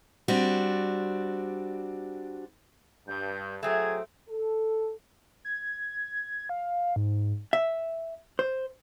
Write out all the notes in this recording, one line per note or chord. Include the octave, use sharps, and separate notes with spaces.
G3 C4 D4 F#4
G2 G6
F#3 A3 C4 G#4 G#6
A4
G#6
F5
G#2
E5
C5